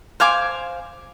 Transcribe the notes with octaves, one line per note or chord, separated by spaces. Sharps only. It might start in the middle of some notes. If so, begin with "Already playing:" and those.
C5 F5 G#5 D6